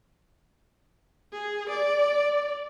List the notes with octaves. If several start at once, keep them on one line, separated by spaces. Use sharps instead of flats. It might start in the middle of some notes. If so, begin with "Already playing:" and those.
G#4
D5